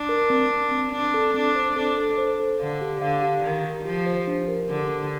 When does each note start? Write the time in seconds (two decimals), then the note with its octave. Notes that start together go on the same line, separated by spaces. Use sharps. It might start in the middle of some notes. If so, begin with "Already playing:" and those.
Already playing: D4
0.09 A#4
0.30 C4
0.50 C4
0.72 C4
0.92 C4 D4
1.14 A4
1.34 C4 D4
1.55 C5
1.76 D4 A4
1.97 A4
2.18 C5
2.40 A4
2.60 D3 F5
2.81 G4
3.02 D3 F5
3.22 G4
3.43 D#3 G4
3.65 G4
3.85 F3 G4
4.06 C5
4.27 D4
4.48 A#4
4.69 D3 G4
4.90 D4